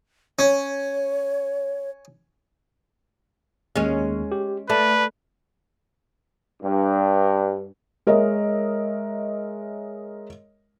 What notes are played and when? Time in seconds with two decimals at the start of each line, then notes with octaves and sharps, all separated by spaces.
0.39 C#4 C#5
3.76 D#2 G#3 C#4
4.32 G4
4.70 A3 B4 D5 A5
6.62 G2
8.07 G#3 A#4 C#5 D#5 E5